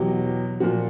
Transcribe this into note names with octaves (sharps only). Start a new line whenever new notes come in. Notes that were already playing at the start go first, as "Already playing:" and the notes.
Already playing: E2 B2 F#3 G4
A#2 F3 F#4